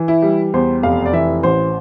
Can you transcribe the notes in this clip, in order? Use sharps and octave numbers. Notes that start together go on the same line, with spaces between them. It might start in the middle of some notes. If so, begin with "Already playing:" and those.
Already playing: E3
E4
G3
E2 C5
F1 F5
D5
E3 E5
A1 C5